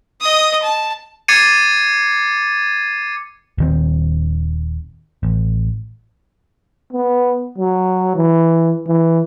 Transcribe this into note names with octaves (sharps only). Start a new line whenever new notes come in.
D#5 D#6
A5
D6 G#6 A6 C7 C#7 D#7
D#1 D#3 C4
A1
B3
F#3
E3
E3